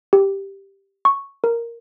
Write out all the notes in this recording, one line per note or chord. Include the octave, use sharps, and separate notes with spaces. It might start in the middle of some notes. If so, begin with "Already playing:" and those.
G4
C#6
A#4